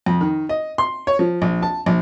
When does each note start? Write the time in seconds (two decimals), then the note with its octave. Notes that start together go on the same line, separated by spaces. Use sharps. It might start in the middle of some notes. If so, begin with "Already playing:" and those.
0.06 F2
0.21 D#3
0.49 D#5
0.78 C6
1.07 C#5
1.19 F3
1.42 A#1
1.62 A5
1.86 A#1